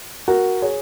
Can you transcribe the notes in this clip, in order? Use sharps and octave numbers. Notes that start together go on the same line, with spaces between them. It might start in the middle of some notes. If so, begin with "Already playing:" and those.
F#4 A#4
G#4 C#5